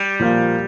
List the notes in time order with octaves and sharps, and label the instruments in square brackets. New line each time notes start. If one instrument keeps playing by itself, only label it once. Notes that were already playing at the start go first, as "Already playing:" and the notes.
Already playing: [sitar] G3
[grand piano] A#2 F3 A#3 F4